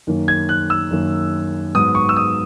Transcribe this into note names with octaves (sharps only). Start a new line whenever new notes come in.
F#2 D#3 A#3
G#6
F#6
E6
F#2 D#3 A#3
G#2 F#3 B3 D#6
C#6
E6
D#6